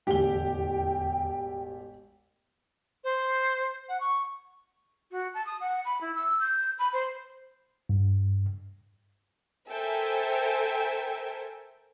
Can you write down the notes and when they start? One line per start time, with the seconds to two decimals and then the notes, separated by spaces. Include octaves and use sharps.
0.07 E1 A1 E2 D3 G4 G5 G7
3.04 C5
3.89 F#5
4.00 C#6
5.11 F#4
5.34 A5
5.46 D#6
5.60 F#5
5.85 B5
6.01 E4
6.15 E6
6.40 G6
6.79 B5
6.93 C5
7.89 G2
9.70 A4 A#4 C5 E5 G5 G#5